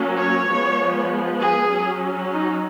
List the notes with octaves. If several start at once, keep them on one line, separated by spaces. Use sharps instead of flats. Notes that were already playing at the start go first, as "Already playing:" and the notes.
Already playing: F#3 A#3 C#4
C#5
F3 G#3 B3
G#4
F#3 C#4
D#4